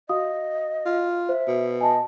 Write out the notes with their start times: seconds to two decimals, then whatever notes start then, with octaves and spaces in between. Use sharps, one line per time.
0.09 F#4 D#5 F5 D#6
0.85 F4
1.29 C5 E5
1.47 B2
1.81 D#5 G#5 A5